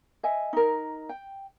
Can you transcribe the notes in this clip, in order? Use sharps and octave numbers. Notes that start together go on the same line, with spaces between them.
D#5 E5 G#5
D#4 A#4
G5